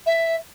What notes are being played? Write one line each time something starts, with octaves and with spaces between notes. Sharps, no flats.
E5